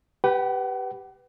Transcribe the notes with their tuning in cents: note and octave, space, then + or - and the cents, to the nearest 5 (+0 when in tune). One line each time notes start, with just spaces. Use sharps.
G4 +0 B4 +0 F#5 +40